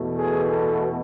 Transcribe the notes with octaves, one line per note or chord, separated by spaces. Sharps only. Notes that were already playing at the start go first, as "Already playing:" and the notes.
Already playing: E2 B2 A3
G#4
A4